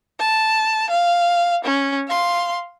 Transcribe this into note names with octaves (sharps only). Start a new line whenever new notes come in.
A5
F5
C#4
F5 C6